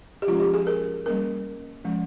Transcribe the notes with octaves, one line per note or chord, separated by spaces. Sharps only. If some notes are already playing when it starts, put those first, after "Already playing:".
G4
F3 G#3 C#4 F4
G4
G#4
A#4
G3 A#3 C#4 A#4
F3 G#3 C#4